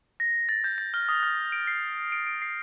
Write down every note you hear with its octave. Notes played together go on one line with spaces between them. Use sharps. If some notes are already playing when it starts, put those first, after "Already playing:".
A#6
A6
G6
A6
F6
D#6
F6
D7
C7
D7
D7
C7